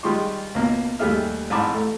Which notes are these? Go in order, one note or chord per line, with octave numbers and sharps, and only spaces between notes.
D#3 G3 G#3 F4 C6 C#6
C#2 B2 A#3 A#5
D#2 G3 A3 G#4 E5 F6
A1 G#2 G#5 A5 B5 D6
A3 A#5